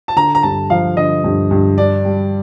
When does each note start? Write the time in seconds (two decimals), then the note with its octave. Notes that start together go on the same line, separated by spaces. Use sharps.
0.08 A5
0.16 D3 A#5
0.35 A#5
0.43 G2 A5
0.70 F3 F5
0.97 D3 D#5
1.24 G2
1.51 G2
1.78 D4 D5
2.05 G3